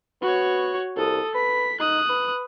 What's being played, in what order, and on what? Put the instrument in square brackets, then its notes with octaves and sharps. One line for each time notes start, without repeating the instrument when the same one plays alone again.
[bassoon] B3 [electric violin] F#4 C#5
[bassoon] C2 [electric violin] A4 D#6
[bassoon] B4 [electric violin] B6
[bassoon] D#4 [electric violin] D#6 F#6
[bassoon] B4